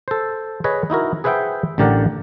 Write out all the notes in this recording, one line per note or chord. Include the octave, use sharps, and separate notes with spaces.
A4 C5
G#4 B4 C#5 D#5
D#4 E4 F#4 A#4
G#4 B4 C5 E5 F#5 G5
A1 D3 G4 A#4 D5 F#5